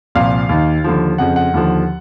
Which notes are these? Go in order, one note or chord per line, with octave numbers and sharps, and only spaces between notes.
C2 A#2 F3 F5
D#2 D#3
D#2 D3 F3
F2 C#3 F3 F#5
F#5
D#2 D3 F3